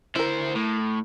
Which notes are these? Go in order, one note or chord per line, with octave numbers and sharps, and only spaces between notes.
D2 E4 A#4 C5
A2